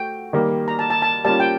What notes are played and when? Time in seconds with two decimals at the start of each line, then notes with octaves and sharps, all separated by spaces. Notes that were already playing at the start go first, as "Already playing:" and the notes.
Already playing: A3 F#4 G5
0.33 D#3 G3 A#3
0.68 A#5
0.79 A5
0.90 A5
1.02 A5
1.25 G3 A#3 C#4 F4 A5
1.40 G5